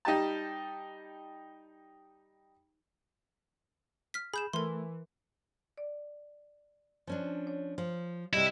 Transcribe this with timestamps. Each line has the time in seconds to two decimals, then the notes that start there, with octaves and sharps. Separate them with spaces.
0.05 G3 D#4 G4 A5
4.14 F6 B6
4.34 G#4 B5 G6 E7
4.53 E3 A3 A#4 C6
5.78 D5
7.07 F3 C#4 D4
7.47 C#5
7.78 F3
8.33 C3 G3 E4 D#5 A#6